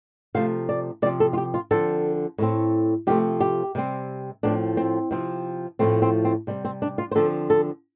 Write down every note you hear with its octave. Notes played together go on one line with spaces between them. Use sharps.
C3 F3 A3 F5
D5
C3 F3 C4 D5
A4
F4
G4
F4
D3 F3 C4 A4
A2 A3 C4
C3 F3 A3 C4 G4
G4
C3 G3 C4
A2 F3 C4 D4
C4
C3 F3 C4
A2 F3 A3 C4
C4
C4
C3 G3 C4
C4
D4
F4
C5
D3 F3 C4 A4
A4